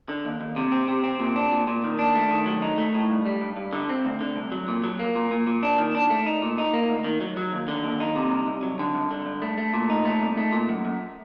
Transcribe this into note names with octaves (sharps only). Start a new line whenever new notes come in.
D3
D#2
D#2
C3
C4
C3
C4
A#2
D4
A#2
A#2
D#3
D4
A3
D#3
F#3
D#4
A3
A2
G2
G3
G2
G2
D3
C4
D2
D3
C2
F#3
A#2
F#3
A#3
A#2
A#2
A#2
D4
D#3
D4
A3
D#4
A#2
D#4
A#3
D2
D#3
F#3
F#3
D#2
D3
D#2
D#4
C3
C2
C2
F#3
D3
G2
D3
G2
A3
A3
A#2
D#4
A3
C2
A3
A#2
F#2
F#2